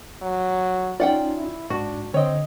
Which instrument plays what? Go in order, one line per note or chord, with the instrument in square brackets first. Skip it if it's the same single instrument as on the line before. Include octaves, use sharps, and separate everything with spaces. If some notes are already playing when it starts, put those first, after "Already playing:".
[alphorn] F#3
[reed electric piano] C#4 D#4 F4 [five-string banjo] D5 F#5 G5
[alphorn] E4
[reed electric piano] G#2 [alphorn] D4 [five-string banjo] F#4
[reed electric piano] D3 D#5 [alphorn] C4 [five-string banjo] C#5